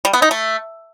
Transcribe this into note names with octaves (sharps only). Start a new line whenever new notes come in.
G3
B3
D#4
A3